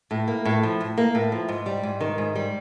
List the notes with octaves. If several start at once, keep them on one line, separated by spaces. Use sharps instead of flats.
A2
A#3
A2
F3
A2
A#3
A2
F3
G#2
G3
G#2
D#3
G#2
G3